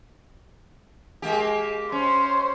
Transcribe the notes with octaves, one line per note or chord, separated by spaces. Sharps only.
G#3 A#3 G4
C#4 C5